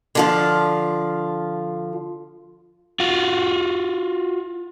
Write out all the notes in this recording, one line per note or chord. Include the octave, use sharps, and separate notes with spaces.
D3 F3 F4
F4 F#4